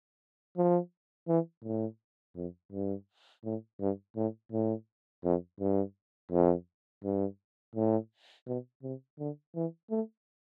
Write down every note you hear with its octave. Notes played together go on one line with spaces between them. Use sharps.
F3
E3
A2
F2
G2
A2
G2
A2
A2
F2
G2
F2
G2
A2
B2
C3
D3
E3
A3